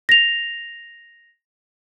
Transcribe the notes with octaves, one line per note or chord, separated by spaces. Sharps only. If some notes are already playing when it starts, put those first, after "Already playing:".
A#6 F7